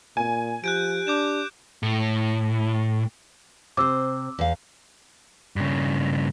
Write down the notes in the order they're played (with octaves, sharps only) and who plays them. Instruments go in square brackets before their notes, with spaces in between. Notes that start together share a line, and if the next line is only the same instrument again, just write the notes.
[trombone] A#2 [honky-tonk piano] G#5
[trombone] F3 [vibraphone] G4 [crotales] F#6 G6 D7
[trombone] D4 [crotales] D6 G6 E7
[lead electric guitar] A2
[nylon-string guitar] C3 C5 [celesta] D6 E6
[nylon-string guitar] E2 F5
[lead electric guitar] G2 C#3